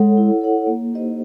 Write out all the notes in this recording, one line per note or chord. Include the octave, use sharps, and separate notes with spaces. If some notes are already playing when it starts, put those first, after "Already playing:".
Already playing: G#3 A4 C#5 F#5
E4
A4 C#5 F#5
A#3
D#4 G4 C5 D#5